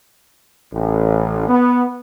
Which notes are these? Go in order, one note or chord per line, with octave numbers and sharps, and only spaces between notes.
A1
B3